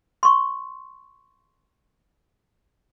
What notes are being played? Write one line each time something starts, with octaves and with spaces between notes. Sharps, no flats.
C6 C#6